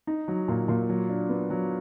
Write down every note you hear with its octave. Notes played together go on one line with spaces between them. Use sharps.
D#4
F#3
A#2
A#2
F#3
D4
B3
F#3